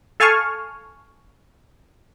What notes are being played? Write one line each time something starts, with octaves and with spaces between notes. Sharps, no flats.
A4 F5 G#5 A5 C#6 F6